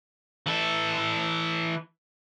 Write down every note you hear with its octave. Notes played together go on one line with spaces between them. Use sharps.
E3 A4